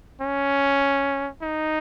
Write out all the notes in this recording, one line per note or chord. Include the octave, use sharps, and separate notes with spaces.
C#4
D#4